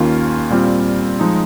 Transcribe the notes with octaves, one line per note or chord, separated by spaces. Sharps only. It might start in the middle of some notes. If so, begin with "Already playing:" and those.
Already playing: D#2 D#3 A#3 C#4 F4
A#2 G3 C4 F4
F3 G#3 D#4